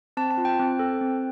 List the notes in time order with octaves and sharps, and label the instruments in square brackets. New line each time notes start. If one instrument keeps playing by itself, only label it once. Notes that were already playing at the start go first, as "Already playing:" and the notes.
[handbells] C4 A5
A5
F4
G5
C4
A4
C4